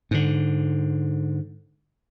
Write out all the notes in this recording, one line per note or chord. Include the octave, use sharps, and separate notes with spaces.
G#2 D3